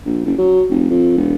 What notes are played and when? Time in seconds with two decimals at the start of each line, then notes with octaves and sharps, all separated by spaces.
0.06 A#1
0.25 F#1
0.38 F#3
0.71 F1
0.90 F2
1.18 E1